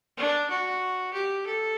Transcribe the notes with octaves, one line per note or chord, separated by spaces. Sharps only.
D4
F#4
G4
A4